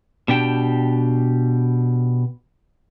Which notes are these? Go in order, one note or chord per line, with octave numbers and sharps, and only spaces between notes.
B2 D4 G4 G5